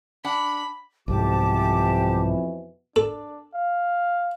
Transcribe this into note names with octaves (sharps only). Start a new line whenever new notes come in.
D4 F#5 B5
C2 F2 G#2 B2 E3 G4 A5 D6
D4 A4
F5